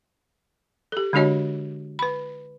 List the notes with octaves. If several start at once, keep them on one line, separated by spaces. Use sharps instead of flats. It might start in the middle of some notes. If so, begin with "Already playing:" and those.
G4 A4
D3 G#3 D4 F#4 C#5 D#5
B4 B5